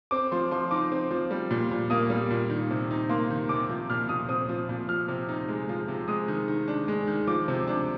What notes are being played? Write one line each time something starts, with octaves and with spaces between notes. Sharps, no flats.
C4 D6
F3 C6
F3 C6
D#4 D6
C4
F3
G3
A#2
A#2
A#3 D#6
G3
A#2
D#3
C3
D#4
A#3 C6
D#3
C3 D6
F3
A#2 F6
A#2 D#6
C4 D#6
F3
A#2
F3 F6
C3
D#4
G#3
F3
C3
G#3 D#6
D#3
D#3
D4
G#3
D#3
F3 D6
C3
D4